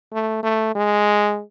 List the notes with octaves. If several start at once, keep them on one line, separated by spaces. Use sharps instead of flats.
A3
A3
G#3